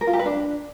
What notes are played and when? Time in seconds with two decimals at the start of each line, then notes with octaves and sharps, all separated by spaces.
0.01 A#4
0.07 F4
0.13 G4
0.19 B4
0.26 D4